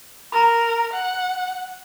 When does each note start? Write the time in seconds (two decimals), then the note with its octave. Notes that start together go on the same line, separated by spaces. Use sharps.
0.32 A#4 A#5 B5
0.93 F#5